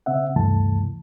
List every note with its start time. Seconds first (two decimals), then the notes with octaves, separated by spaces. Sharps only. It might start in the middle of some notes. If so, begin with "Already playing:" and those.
0.06 C#3 C4 E5 F#5
0.36 D2 G2 C3 E3 A3 A5